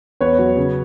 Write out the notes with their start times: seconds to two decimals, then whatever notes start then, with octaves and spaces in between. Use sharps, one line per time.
0.21 E2 B4 C#5
0.39 F#3
0.57 C#3